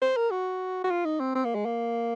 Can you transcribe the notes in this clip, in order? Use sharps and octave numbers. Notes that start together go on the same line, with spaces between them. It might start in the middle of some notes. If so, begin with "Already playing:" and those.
C5
A#4
F#4
F#4
F4
D#4
C4
C4
A#3
G#3
A#3